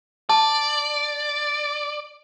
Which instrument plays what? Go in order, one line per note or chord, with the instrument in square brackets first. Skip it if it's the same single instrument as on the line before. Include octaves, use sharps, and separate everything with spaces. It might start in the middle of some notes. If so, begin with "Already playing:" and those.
[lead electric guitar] D5 [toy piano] A5